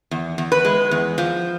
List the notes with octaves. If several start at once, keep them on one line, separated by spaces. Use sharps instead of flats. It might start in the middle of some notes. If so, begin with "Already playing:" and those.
E2
E2
B4
G#3
E2
F3